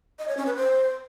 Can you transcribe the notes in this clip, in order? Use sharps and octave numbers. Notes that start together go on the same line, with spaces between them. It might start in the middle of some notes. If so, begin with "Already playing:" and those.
D#5
C#5
C#4
B4
C5